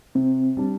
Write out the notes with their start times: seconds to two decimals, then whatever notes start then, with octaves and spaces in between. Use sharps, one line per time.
0.15 C3 C4
0.57 G3 D4